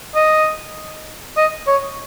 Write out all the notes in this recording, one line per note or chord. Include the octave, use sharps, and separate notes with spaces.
D#5
D#5
C#5